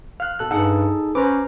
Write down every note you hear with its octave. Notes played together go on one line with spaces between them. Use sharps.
F5 F6 F#6
B2 A4 F#6
G2 D#4 G#4 A4 F#5
C#4 B4 C5 A#5 D6